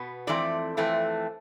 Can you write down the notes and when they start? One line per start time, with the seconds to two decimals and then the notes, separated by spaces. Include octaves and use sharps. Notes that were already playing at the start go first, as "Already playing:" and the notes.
Already playing: B2 B3
0.27 F2 E3 A3 C4 D5
0.77 F2 E3 A3 C4